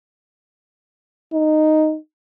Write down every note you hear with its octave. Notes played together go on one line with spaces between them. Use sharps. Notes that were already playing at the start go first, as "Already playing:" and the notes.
D#4